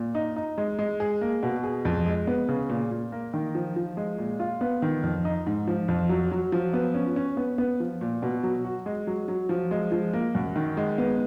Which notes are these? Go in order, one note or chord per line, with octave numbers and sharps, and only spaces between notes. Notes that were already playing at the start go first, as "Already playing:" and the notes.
Already playing: A#2
D#4
D#4
G#3
G#3
G#4
A#3
B2
G#4
F2
G#3
B3
C#3
A#2
A#2
A#3
D#3
F3
F3
G#3
A#2
F4
B3
D#3
F2
D#4
G#2
F3
F2
F#3
F#3
F3
B3
C#4
C#4
B3
B3
F3
A#2
B2
F#3
F#4
G#3
F#3
F#3
F3
G#3
F3
A#3
F#2
D#3
G#3
B3